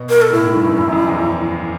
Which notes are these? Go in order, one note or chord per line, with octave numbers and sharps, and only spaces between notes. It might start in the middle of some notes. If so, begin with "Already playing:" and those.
Already playing: B2
A#4
A4
A2 E4
G#2
G2
F#2
E2
F#2
F2
E2